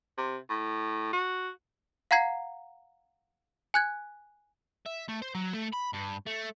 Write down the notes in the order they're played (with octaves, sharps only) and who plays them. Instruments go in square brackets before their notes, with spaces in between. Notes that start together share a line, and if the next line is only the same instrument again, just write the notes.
[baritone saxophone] C3
A2
F#4
[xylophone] F5 F#5 A#5 G#6 C7
G#5 F#6 G#6
[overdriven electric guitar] E5
A3
C5
F#3
A3
B5
G2
A3